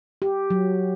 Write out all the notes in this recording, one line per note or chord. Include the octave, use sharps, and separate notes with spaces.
G4
F#3